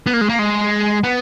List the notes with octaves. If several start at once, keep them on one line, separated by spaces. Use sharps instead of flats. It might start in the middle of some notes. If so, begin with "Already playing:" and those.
B3
A#3
G#3
A#3
G#3
B3